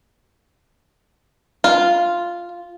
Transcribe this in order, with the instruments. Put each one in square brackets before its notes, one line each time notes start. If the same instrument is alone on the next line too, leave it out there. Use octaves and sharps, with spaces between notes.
[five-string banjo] F4